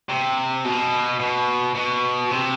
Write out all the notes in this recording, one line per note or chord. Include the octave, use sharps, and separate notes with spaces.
C3
B2
B2
B2
C3